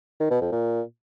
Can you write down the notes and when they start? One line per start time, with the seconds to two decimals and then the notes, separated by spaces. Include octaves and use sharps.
0.20 D#3
0.31 B2
0.41 F2
0.52 A#2